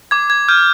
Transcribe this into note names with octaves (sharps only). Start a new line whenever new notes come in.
D6 G#6
G#6
F6 G6